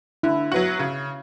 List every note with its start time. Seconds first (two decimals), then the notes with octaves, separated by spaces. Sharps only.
0.23 D3 E4
0.52 F#3 B3 F#4
0.79 C#3